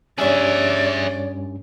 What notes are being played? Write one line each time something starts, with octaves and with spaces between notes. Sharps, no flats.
G2 G3 C#4 G#4 C#5 D5 E5